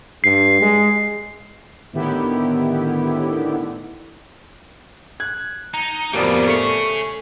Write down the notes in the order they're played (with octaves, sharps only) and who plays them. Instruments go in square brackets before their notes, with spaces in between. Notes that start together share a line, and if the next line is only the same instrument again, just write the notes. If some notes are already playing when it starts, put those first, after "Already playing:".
[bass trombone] G2 [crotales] C7
[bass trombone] G#3
[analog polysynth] A2 D3 D#3 B3 E4 G4
[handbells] F#6 [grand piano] G#6
[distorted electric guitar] D#4 [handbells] A#5
[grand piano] D1 F2 B3 [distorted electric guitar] G3 A#3 [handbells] G4 A#4 D5
[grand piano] A3 [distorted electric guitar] G#4 C#5 [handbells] C#6 B6